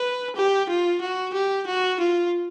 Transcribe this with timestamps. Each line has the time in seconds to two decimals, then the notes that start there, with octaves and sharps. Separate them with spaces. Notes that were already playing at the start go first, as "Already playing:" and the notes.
Already playing: B4
0.36 G4
0.69 F4
1.01 F#4
1.34 G4
1.67 F#4
1.99 F4